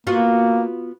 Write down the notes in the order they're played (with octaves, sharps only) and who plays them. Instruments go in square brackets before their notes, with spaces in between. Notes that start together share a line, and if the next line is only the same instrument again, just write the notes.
[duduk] A#3 [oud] B3 F4 F#4